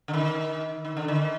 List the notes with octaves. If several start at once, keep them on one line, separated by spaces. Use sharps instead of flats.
D3
D#3
D#3
D3
D#3